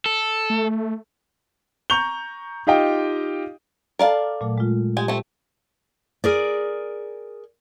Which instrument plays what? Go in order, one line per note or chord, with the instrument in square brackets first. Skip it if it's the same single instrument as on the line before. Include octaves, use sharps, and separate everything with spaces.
[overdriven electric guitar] A4
[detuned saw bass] A3
[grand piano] A#5 C#6 G6 F7 G7
D#4 F4 G4 D#5 G5
[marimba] A4 A5 [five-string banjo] A#4 D5 F5
[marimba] A#2 F#3 A3
G#3 A3 F4
[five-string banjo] G#3 G#5 [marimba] G4
[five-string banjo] A3 C4
[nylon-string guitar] G#4 A#4 D5